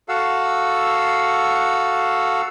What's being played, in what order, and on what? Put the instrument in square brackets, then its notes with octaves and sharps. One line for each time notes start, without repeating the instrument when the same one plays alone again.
[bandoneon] F#4 A4 F5 F#5 E6